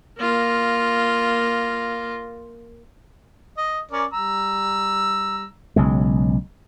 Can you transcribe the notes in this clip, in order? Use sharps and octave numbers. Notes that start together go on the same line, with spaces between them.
A#3 F4
D#5
C#4 A#4 D5
G3 A#5 E6
B1 C#3 G#3